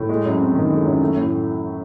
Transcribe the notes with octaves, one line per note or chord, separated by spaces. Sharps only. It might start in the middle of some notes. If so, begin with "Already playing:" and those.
Already playing: A2
G#3
F#2
C4
D#3
G#3
F#2
A3
A2